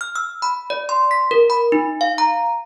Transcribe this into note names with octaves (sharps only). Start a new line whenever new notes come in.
F6
E6
B5
D5
C6
B6
A#4
B5
D#4
F5
A#5